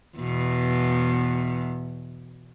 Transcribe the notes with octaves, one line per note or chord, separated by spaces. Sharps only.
E2 B2